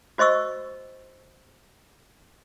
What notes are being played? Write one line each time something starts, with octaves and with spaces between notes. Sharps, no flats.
F#4 C5 D#5 C#6 E6